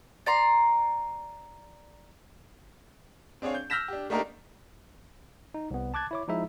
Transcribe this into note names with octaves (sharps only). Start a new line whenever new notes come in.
D5 A#5 C6
C4 D4 G#4 C#5 F5
G6
E6 F6 G6 A#6 B6 E7
D4 G4
A3 A#3 D4 D#4 G4 A#4
D#4
C2 B3
A5 D6 F#6 G#6 A6
E4 C#5 D6
F3 G#3 D#4 E4 G#4 E5